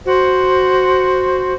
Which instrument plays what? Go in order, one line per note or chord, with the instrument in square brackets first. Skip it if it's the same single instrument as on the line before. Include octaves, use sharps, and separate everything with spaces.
[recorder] F#4 [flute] C5